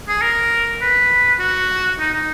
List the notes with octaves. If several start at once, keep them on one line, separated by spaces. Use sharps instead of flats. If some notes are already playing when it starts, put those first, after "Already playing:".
G#4
A#4
B4
F#4
D#4
D#4